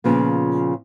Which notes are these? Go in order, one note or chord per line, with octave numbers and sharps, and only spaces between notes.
A#2 C#3 F3 B3